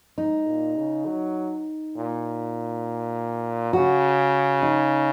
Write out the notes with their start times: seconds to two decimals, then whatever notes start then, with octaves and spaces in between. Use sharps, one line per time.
0.18 G#2 D#4
0.47 A#2
0.77 C#3
1.06 F#3
1.96 A#2
3.73 C#3 F#4
4.62 D#4